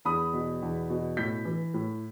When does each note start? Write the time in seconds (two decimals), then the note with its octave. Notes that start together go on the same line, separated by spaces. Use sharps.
0.05 E2 B5 D#6
0.33 B2
0.62 E2
0.90 B2
1.17 A2 G6 B6
1.45 E3
1.74 A2